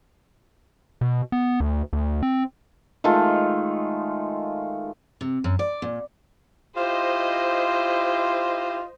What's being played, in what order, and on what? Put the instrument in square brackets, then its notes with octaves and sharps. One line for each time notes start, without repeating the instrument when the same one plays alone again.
[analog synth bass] B2
B3
D2
D2
C4
[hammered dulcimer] D#3 G#3 A3 F4
[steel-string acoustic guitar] C3
F#2
D5
A#2
[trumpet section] E4 G4 [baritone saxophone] F4 [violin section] C5 D#5